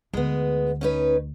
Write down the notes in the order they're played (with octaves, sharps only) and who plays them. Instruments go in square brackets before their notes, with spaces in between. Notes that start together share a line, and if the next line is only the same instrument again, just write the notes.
[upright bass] D2 [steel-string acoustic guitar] G#3 B3
[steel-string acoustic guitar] C#4 D#4 B4